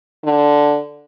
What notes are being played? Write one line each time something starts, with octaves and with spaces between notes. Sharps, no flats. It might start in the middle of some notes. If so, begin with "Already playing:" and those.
D3